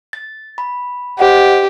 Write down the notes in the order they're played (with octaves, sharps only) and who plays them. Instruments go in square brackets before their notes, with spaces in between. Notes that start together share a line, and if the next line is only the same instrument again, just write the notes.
[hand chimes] A6
B5
[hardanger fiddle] G4 [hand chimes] C5 D#5 F#5